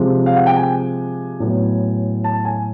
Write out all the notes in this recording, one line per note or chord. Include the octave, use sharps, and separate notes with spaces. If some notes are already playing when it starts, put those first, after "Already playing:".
Already playing: C3 F3 G#3
F5
F#5
G5
G#5
A2 F#3 B3
A5
G#5